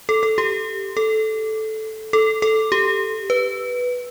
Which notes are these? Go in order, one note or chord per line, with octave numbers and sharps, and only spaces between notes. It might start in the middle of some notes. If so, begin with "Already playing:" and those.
A4
A4
G4
A4
A4
A4
G4
B4